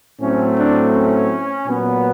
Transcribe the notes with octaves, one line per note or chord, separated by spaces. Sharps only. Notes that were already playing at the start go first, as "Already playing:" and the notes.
A2 F#3 A3 C4 C#4
D4
C#4
A#2 F#3 B3